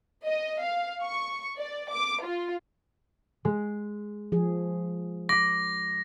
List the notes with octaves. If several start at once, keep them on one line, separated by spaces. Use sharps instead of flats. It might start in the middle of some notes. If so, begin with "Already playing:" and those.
D#5
F5
C#6
D5
D6
F4
G#3
F3 G#4
D6 A#6 B6